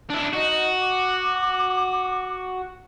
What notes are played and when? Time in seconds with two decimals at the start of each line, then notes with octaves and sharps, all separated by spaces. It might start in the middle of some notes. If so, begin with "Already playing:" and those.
0.10 D4 E4
0.33 D#4 F#4
0.81 D6